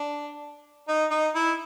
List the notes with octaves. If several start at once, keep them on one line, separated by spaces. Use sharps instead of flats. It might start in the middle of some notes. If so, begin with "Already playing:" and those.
Already playing: D4
D#4
D#4
E4